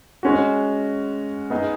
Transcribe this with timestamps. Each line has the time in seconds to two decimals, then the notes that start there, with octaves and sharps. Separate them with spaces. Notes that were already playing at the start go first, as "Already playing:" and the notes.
0.23 G#3 C#4 F#4
1.50 B3 D#4 G#4 D#5